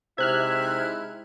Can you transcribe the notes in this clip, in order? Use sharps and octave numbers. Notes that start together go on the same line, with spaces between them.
C3 G#3 D#4 E4 E5 F6 F#6 G#6